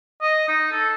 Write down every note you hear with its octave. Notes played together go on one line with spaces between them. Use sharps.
D#5
D#4
A4